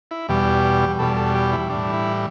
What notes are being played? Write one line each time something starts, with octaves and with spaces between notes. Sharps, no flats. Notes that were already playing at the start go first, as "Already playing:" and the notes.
E4
E2 B2 G3 G4
E2 B2 G3 A4
A4
G4
E4
A2 E3 G3 D4
E4